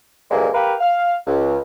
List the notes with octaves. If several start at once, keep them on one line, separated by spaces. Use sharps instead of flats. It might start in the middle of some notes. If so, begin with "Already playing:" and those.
D2 G2 A#2 G#3 A#3
G4 A#4 B4 F5
F5
C#2